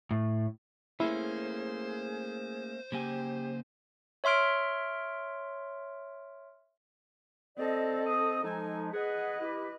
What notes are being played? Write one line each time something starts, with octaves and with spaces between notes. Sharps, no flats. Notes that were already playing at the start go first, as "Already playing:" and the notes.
A2
A3 A#3 C#4 E4 G#4 C5
C#3 A#3 G4 G#5
C#5 E5 C6 F6 D7
C4 A4 D5 D#5
D#5 D#6
F3 G#3 D#4 A4 G#5
G#4 B4 D#5 F#5
E4 G4